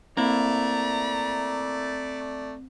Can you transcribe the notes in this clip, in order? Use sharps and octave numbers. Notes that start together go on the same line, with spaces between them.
A3 A#3 C4 E4 D5 A#5